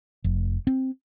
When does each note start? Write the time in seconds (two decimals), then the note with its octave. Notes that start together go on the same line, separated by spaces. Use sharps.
0.24 F1
0.67 C4